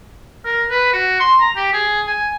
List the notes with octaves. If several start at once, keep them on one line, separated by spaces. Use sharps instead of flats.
A#4
B4
F#4
C6
A#5
G4
G#4
G#5